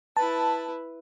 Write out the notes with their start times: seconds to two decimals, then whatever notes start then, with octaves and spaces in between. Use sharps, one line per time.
0.17 E4 B4 A5